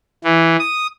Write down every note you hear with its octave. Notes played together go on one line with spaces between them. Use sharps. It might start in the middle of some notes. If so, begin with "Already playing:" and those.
E3
D#6